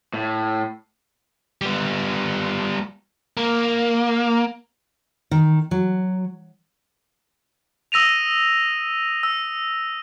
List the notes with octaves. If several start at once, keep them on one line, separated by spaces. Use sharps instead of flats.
A2
G3 B3
A#3
D#3
F#3
D#6 E6 A#6 D#7 F7
E6